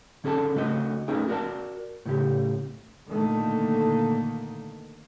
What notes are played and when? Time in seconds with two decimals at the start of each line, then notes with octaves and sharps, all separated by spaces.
0.24 D3 C#4 G#4 A4 D5 A5
0.56 C#3 A3 D4 F#4 D#5
1.08 A3 C#4 D#4 G#4 G5
1.28 F#4 A#4 D5 A5
2.06 A2 C#3 G4
3.10 A#2 D3 D#3 A3 A#3